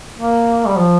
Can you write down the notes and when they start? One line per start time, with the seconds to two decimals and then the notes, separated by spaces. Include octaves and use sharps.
0.18 A#3
0.67 G3
0.77 F3